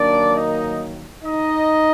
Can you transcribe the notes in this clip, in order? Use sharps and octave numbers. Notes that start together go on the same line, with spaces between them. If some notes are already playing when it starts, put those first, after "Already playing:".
Already playing: D#3 F#3 A#3 D4 D5
D#4 D#5
D#4 D#5